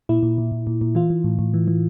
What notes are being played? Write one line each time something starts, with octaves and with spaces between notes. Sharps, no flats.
A#2 E4
A#2
A#2
A#2
A#2
A#2
E3 F4
E3
A2
A2
E3
E3